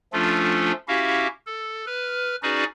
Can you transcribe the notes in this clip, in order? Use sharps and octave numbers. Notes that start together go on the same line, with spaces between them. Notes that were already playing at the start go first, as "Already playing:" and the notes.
F3 A3 C#4 D4 F4 A4
C#4 E4 F#4 G4 E5 F5
A4
B4 F6
C#4 D#4 F#4 G#4 B4 D5